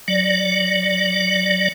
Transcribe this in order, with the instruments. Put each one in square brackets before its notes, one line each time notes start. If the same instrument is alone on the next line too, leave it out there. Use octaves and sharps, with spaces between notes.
[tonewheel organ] F#3 D5